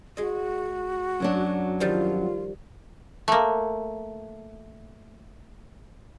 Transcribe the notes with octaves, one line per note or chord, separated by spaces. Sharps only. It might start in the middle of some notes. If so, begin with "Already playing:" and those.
G#3 F#4 D#5
F#2 F#3 D4
D#3 F3 G3 F4
A3 A#3